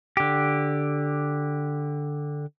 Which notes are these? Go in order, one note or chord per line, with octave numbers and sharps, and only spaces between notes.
D3 G4